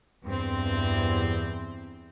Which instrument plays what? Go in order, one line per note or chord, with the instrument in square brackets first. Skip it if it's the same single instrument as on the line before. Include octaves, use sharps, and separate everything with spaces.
[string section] E2 G2 C4